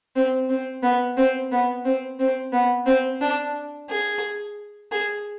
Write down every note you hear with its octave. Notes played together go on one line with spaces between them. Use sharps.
C4
C4
B3
C4
B3
C4
C4
B3
C4
D4
G#4
G#4